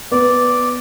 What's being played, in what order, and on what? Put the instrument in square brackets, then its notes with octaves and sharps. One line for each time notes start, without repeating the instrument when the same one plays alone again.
[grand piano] B3 [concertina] D5